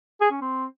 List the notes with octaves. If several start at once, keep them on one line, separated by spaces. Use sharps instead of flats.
G#4
C#4
C4